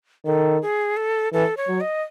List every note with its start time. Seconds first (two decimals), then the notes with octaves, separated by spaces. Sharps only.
0.26 D#3 A4
0.62 G#4
0.97 A4
1.33 E3 A4
1.57 C#5
1.69 F#3
1.81 D#5